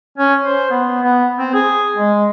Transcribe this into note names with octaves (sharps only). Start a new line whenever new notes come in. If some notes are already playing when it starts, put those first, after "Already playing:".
C#4
C5
B3
B3
C4
G#4
G#3